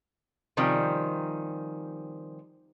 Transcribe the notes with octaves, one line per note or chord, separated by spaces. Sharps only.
C3 D#3 F3 G3 C#4